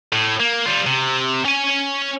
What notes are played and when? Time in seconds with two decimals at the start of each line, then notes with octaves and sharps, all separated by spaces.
0.13 A2
0.40 A#3
0.66 G3 F4
0.86 C3
1.45 C#4 G#5